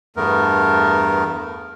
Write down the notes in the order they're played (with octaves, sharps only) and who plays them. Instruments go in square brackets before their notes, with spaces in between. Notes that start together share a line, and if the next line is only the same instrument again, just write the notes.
[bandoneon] E2 G2 A3 B3 A#4